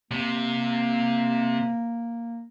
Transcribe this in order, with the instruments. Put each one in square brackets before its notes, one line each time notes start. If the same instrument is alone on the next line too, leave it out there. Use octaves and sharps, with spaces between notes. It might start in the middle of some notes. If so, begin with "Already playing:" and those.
[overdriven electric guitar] C3 [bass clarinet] A#3